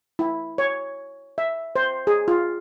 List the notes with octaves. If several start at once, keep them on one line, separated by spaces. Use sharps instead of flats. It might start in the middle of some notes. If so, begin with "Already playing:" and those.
E4
C#5
E5
C5
G#4
F4